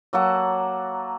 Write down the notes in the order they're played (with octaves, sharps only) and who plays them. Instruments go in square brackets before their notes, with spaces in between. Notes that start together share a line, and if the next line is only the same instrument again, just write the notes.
[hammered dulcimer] F#3 A#3 A4 F#5